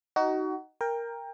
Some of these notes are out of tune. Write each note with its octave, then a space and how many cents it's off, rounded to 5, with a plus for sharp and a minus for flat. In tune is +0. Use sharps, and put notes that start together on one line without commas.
D#4 +5 F#4 +25
A#4 +0 G5 +25